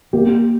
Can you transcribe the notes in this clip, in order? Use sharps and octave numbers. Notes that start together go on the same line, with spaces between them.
A#3 G4